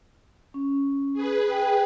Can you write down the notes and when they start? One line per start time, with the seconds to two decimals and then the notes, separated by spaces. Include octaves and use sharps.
0.54 C#4
1.13 G#4 B4
1.50 G5